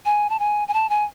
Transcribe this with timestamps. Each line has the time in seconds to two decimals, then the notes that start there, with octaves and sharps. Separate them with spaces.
0.05 G#5
0.30 A5
0.39 G#5
0.68 G#5
0.74 A5
0.90 G#5